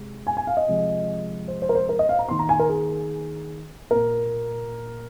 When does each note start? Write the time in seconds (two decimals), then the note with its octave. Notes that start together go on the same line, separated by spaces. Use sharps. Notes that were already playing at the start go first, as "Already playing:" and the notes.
Already playing: C3 G#3
0.27 G#5
0.37 G#5
0.47 F5
0.57 D#5
0.67 C3 F3 G#3
1.48 C5
1.62 C5
1.69 A#4
1.75 C5
1.89 A#4
1.99 D#5
2.09 F5
2.19 A#5
2.29 D#3 A#3 C6
2.39 A#5
2.49 G#5
2.59 A#4
2.69 G#4
3.91 A#2 A#3 A#4